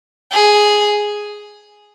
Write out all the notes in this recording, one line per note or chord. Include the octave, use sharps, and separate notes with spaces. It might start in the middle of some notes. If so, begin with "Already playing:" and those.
G#4